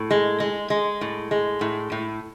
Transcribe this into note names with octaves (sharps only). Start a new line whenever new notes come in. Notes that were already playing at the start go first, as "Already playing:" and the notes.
Already playing: A2
G#3
G#3
G#3
A2
G#3
A2
A2